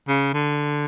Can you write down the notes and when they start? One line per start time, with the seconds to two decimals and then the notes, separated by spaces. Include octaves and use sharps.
0.08 C#3
0.34 D3